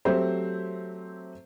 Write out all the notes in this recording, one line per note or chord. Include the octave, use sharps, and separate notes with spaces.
F#3 A3 C4 G4 C5 E5